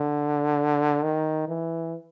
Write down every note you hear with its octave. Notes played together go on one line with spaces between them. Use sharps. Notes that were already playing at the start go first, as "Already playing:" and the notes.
Already playing: D3
D#3
E3